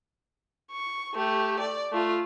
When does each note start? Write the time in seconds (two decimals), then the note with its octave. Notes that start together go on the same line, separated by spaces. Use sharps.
0.72 C#6
1.15 A3 G4
1.59 D5
1.92 A3 F4